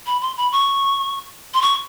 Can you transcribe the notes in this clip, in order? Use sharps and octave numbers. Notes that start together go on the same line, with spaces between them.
B5
C6
B5
C#6
C6
C#6